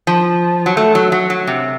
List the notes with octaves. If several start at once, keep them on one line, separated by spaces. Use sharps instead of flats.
F3
F#3
A3
F#3
F#3
F#3
C3